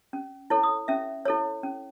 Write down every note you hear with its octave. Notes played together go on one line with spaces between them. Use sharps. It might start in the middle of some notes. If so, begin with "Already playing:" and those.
C#4
E4 A4 C#5
D#6
C#4 E5
E4 A4 C#5
C#4